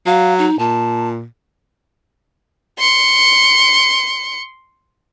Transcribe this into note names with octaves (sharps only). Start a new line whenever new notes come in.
F#3 F5
D#4
A#2 A5
C6 C#7